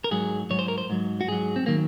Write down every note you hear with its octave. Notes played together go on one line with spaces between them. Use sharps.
A#4
G#2 F#3 G#4
G#2 F#3 C#5
C5
A#4
C5
G#2 F#3
F#4
G#2 F#3 G#4
C4
D#3 F#3 A#3